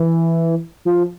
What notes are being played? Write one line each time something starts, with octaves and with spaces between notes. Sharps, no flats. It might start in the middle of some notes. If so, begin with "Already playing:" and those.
Already playing: E3
F3